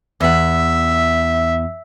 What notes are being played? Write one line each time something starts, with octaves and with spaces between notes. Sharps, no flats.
E2 E5 F#5